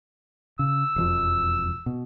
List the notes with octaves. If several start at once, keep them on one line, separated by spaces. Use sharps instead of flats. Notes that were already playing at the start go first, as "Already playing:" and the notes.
C#3 E6
E1 F2 F3
B2